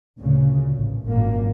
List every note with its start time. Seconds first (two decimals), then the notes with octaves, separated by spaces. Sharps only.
0.18 D2 A#2 C#3
0.77 A1
1.08 G#1 F#2 A#2 A#3